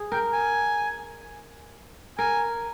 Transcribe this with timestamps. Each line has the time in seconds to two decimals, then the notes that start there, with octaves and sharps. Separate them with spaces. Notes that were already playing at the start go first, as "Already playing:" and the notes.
Already playing: G#4
0.12 A#4 G5
0.33 G#5
2.18 A#4 G#5